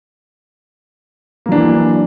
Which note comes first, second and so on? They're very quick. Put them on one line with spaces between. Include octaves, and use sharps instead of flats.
A#3 F#3 D4 E3